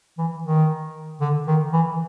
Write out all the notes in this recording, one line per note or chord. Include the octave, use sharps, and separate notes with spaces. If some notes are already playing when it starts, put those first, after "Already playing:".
E3
D#3
D3
D#3
E3